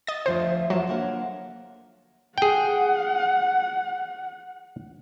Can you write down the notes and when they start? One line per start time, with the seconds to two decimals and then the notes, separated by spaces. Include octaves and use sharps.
0.07 D#5 A6
0.26 D2 F3 C5 D5 E5
0.70 F3 F#3 F4 A5
0.87 D3 A#3 C#5 F#5
2.38 G#4 F#5 G5